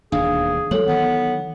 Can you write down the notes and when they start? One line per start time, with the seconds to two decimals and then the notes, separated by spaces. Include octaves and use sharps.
0.12 E1 D#2 D4 G#4 F5
0.71 F#3 G#3 A#3 A4 C#5 F#7
0.88 D#3 E3 F#3 B3